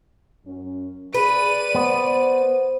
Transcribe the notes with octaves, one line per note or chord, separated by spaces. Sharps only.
F#2 C#4
G#4 B4 D5 D#7
B3 C5